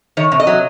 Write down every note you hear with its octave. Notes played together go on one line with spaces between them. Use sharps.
D#3 C#5
C3
D#5
F#3